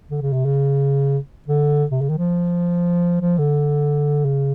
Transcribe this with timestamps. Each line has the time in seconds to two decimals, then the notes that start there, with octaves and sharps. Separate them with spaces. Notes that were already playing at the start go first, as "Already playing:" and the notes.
0.11 D3
0.22 C#3
0.33 C3
0.45 C#3
1.48 D3
1.92 C3
2.01 C#3
2.09 D#3
2.18 F3
3.21 F3
3.38 D3
4.25 C#3